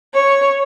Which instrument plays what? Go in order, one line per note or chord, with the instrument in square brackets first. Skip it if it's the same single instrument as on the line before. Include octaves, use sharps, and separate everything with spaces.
[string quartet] C#5